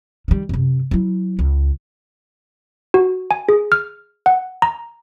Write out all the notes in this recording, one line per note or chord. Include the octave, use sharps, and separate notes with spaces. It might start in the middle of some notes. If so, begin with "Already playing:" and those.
D#3 G3
F#2 C3
F#3 E4
C#2
F#4
G#5
G#4
F6
F#5
A#5